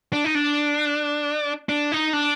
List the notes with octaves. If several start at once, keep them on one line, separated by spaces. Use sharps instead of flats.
D4
D#4
D4
D4
D#4
D4